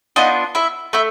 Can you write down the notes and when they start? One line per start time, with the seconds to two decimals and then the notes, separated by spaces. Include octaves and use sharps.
0.16 B3 D4 D#4 F4 D#5
0.55 E4 E5
0.93 A3 E4 E5